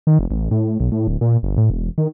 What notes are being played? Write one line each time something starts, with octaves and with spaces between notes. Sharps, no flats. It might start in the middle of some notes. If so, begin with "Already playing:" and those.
D#3
F1
A1
A2
B1
A2
D1
A#2
G1
A2
E1
D#3